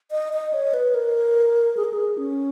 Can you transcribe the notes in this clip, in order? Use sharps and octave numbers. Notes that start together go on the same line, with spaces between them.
D#5
D#5
C#5
B4
A#4
G#4
A#4
G#4
C#4